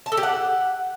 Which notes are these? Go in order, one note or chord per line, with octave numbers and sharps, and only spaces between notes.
A5
A4
G4
F#5